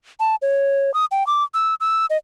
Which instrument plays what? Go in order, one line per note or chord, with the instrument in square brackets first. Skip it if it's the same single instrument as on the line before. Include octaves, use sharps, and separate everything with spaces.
[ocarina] A5
C#5
D#6
G5
D6
E6
E6
D#5